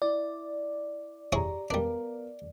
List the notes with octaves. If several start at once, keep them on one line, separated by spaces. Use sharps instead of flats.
E4 D5
E4 G4 G#4 C#5 A#5
G3 B3 D4 A#4 F5